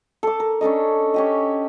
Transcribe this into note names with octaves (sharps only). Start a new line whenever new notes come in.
A4 D6
A#4
C#4 D4 A4 D#5
C#4 G4 D#5